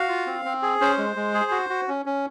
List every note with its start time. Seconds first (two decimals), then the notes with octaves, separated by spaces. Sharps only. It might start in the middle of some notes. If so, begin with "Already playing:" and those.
Already playing: F#4 F5
0.09 F4
0.27 C4
0.45 C4
0.62 G#4
0.81 C#4 C5
0.98 G#3
1.16 G#3
1.34 G#4
1.51 F#4
1.70 F#4
1.88 C#4
2.06 C#4